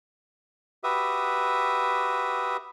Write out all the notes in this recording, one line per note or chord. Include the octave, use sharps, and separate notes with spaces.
F#4 G4 B4 E5 D#6